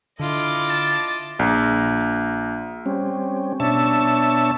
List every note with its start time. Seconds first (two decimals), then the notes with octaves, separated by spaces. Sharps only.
0.19 D3 E4 F4 D#5 D6
0.69 A5
1.39 A#1
2.86 G3 C4 C#4
3.60 B2 D4 C#5 E5 A5 E6